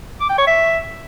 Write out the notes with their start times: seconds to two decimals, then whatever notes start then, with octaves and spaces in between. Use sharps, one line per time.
0.21 D6
0.29 G5
0.38 C#5
0.47 E5